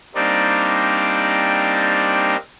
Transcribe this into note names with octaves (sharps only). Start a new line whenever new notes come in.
G3 A#3 C4 D4 D#4 D5